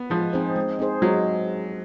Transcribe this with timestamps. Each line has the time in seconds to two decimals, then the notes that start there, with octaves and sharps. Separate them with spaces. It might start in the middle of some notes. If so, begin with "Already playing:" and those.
Already playing: B3
0.10 F3 G#3
0.33 C4 D#4 G#4 C5
0.56 G#3
0.79 C4 D#4 G#4 C5
1.02 F#3 G#3